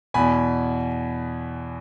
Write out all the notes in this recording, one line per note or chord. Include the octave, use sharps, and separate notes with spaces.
E2 B2 G#5 B5